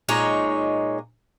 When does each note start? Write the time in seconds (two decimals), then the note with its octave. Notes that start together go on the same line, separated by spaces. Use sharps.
0.08 A#2 G#3 D#4 C#5 A#5